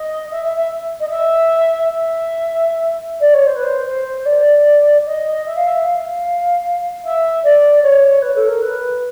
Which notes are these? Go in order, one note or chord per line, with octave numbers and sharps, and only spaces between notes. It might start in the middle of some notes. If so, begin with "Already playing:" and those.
Already playing: D#5
E5
E5
E5
D#5
E5
E5
D5
C#5
C5
B4
C5
C5
D5
D#5
E5
F5
E5
F5
E5
D5
C#5
B4
A4
A#4
B4